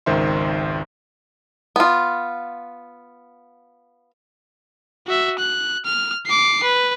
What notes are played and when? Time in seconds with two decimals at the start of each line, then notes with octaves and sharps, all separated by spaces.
0.06 G#1 C#2 D#3 C5 E5 C6
1.76 B3 F4
5.07 F#4 E5
5.39 F#6
5.85 F6
6.26 D6 C7
6.63 B4